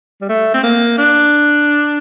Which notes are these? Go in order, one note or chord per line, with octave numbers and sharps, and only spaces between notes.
G3
A3
C4
A#3
D4